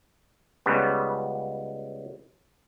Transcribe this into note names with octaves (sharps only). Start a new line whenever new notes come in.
C#2 C#3 G3 B3